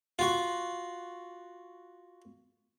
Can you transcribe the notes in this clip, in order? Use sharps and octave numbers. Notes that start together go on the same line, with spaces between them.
F4 F#4